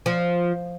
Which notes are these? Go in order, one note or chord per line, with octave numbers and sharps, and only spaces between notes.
F3